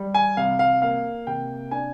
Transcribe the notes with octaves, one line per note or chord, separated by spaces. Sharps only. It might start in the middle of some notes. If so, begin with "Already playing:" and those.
Already playing: G3
G#5
C2 F5
F5
A#3 F5
C3 G5
D4 G#5